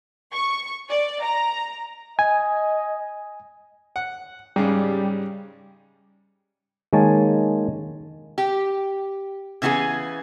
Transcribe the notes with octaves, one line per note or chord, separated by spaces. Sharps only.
C#6
D5
A#5
D#5 G#5
F#5
G#2 C#3 G3
D#3 G#3 A#3 C#5 G#5 A5
G4
C#3 E3 B3 E4 G#4